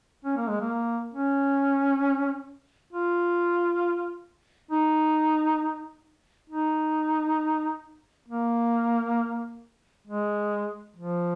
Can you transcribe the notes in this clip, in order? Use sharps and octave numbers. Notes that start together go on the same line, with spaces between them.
C#4
A#3
G#3
A#3
C#4
F4
D#4
D#4
A#3
G#3
F3